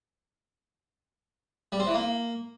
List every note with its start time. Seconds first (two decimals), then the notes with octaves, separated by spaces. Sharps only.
1.72 G3
1.80 C4
1.87 E3
1.94 A#3